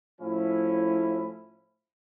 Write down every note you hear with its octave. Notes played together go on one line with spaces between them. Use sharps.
A2 F3 C#4 E4